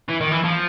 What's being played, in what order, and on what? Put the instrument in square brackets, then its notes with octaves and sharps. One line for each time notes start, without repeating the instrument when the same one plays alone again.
[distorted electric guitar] E3
D#3
E3
F3